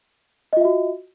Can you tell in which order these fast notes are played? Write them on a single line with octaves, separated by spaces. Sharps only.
D#5 F4 E5 F#4